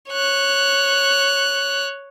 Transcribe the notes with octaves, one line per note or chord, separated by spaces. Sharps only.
C#5 F#6